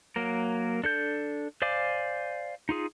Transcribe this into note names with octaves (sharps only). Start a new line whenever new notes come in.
F#3 A#3 A#4
D4 A4 G6
C5 D5 F5 G#5 D6
D#4 F4 G#4